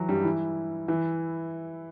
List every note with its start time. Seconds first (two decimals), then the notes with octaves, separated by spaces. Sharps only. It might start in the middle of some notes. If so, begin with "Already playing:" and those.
Already playing: E3 F#3
0.09 G2 G3
0.24 E3 E4
0.88 E3 E4